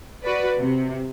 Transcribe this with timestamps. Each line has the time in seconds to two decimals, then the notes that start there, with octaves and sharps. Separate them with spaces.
0.23 F#4 B4 D5
0.59 C3